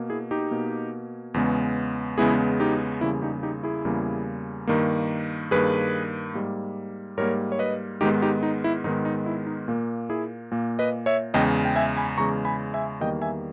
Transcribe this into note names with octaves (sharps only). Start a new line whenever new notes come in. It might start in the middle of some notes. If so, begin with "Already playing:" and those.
Already playing: B2 A#3
E4 G#4
D#4 G4
B2 A#3
E2 C#3 G#3 B3
E2 C#3 G#3 B3 E4 G#4
D#4 G4
E2 C#3 G3 A#3 E4
D#4 G4
D#4 G4
E4 G#4
E2 C#3 G3 A#3
G2 D#3 A#3
G2 D#3 A#3 G#4 B4
G#2 G3 A#3
G#2 G3 A#3 A#4 C#5
C#5
B4 D#5
G#2 D#3 G#3 B3 D#4 G4
D#4 G4
D#4
E4
G#2 D#3 G#3 B3 D#4
D#4
E4
D#4
A#2 A#3
E4 G#4
A#2 A#3
B4 D#5
C#5 E5
E2 C#3 G#3 D#5 G5
G5
E5 G#5
G#5 B5
E2 C#3 G#3 A#5 C#6
G#5 B5
E5 G#5
E2 D#3 G3 A#3 D#5 G5
E5 G#5